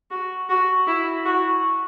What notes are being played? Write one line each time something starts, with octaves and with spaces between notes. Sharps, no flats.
F#4
F#4
E4
F#4